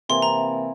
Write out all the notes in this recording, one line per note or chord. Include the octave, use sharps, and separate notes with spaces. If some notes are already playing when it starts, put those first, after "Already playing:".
C3 E3 A#3 E4 C6
A#5